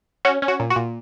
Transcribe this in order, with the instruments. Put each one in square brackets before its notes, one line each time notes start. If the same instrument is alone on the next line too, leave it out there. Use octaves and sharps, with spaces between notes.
[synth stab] C#4 F#4
C#4
F#4
A#2
F#4
A#2